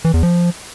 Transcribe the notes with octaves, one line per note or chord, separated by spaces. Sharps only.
E3
E2
F3